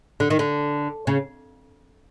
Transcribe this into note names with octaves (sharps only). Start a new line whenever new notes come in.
D3
D#3
D3
C#3